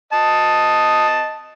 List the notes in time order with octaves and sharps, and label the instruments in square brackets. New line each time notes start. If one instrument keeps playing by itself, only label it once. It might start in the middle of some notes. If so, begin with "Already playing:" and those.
[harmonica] D#5 A5